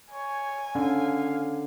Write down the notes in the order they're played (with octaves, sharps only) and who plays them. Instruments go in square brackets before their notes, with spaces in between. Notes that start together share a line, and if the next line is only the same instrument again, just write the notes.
[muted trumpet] C#5 [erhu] G#5
[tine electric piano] D3 [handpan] C#4 [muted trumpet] F5